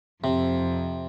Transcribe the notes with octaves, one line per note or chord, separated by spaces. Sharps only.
F2 C3